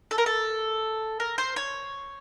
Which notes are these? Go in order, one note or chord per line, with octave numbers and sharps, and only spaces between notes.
A4
A#4
A4
A#4
C5
C#5